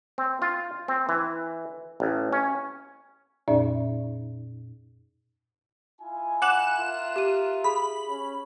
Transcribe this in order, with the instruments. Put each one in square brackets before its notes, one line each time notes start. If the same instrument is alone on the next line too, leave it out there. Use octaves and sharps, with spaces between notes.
[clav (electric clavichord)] C4
F4
C4
E3
A1
C#4
[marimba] F2 A#2 C#4 D#4 D5 E5
[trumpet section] E4 F4 G#5
[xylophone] F#5 D6 F#7 [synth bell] F#6 E7
[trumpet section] F4 A#4 E5
[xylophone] G4 D#7
[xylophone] G#4 [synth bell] B5
[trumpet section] C#4